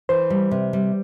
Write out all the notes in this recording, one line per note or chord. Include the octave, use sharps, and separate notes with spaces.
E3 C5
G3
C3
G3